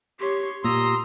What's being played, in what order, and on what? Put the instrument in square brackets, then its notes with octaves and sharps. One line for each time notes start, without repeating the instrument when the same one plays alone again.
[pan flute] G4 [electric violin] C#5 C6
[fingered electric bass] A#2 [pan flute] G4 [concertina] A#5 D#6 E6 [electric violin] C6